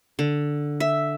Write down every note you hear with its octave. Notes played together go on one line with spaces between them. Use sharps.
D3
E5